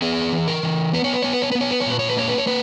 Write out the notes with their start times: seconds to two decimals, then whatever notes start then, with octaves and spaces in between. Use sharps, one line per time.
0.02 B3 G#4
0.33 E3
0.48 A#4
0.63 E3
0.93 B3 B4
1.04 C#5
1.13 B4
1.22 B3 C#5
1.33 B4
1.42 C#5
1.52 B3 B4
1.61 C#5
1.71 B4
1.80 C#5
1.86 A#2 B4
1.99 C#5
2.09 B4
2.17 A#3 C#5
2.28 B4
2.38 C#5
2.47 A#3 B4